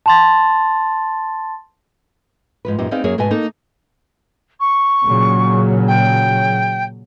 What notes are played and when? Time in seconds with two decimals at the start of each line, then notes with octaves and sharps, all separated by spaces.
0.06 A5 C6 A6
2.65 G#2 F3 B4
2.78 F#2 A#2 D#4 G4
2.91 B3 C4 D#4 G#4 D5 F5
3.04 F#2 F#3 A#3 G#4 A#4 C#5
3.18 G#2 B2 B4 D#5 G#5 A5
3.31 A#3 D#4 A4 D#5
4.60 C#6
5.05 A#2 C#3 F#3
5.88 G5